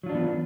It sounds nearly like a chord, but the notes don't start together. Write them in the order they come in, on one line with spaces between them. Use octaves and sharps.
F#3 F4 D4 E3 B3